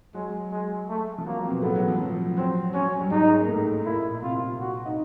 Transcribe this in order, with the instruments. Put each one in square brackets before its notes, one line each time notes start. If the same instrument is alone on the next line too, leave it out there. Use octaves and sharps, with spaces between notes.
[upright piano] F#3 [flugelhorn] G#3
[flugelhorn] G#3
A3
[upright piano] F3
[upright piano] F#3 [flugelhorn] A#3
[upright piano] F#3
C4
B2 B3
[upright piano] A2 A3 [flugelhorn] B3
[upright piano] F#3
F3
F#3
[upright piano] F#3 [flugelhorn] C4
[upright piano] F#3 [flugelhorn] C#4
[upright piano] G3
[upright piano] G#2 G#3 [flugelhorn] D#4
[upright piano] A#3
A2 A3
[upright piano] A#2 A#3 [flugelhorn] E4
[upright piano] C3 C4 [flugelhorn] F4
[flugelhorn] F#4
[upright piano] D#4